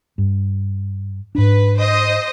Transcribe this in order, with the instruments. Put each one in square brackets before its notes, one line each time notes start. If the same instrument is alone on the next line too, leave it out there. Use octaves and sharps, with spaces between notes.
[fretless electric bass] G2
[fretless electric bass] G#2 D4 [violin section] B4
[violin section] C5 D#5 D#6